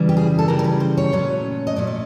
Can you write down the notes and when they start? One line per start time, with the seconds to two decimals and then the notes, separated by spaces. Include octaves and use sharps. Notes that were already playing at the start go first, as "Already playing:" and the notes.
Already playing: C#3 E3 G3
0.09 G4
0.17 G#4
0.39 A4
0.48 C#3 E3 G3 A#4
0.59 A#4
0.64 B4
0.80 C5
0.97 C#5
1.12 A#2 F#3 A3 C#4
1.67 D#5
1.76 A#2 F#3 A3 C#4 D5
1.87 D5